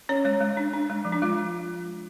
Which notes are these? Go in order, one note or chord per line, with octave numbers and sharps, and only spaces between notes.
C#4 C#5
G#3 C#5
G#3
D4
D4
G#3
F3
D4
G#3 F4